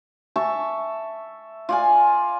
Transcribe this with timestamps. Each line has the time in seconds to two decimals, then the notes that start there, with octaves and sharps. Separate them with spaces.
0.36 E5 A5 C#6
1.69 F4 D5 G#5